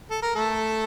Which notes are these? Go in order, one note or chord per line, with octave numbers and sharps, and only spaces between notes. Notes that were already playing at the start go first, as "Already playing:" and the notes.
A4
A#4
A3 A4